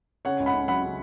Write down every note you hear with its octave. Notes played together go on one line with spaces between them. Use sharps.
C#3 C#5 F#5
C#2
F#5 B5
C#4
F#3 F#5 B5
C#3